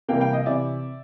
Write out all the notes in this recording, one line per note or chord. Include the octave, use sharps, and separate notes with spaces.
C3 E3 G3 A#3 F5 G5
F5 G5
D#5 F5
C3 E3 D5 E5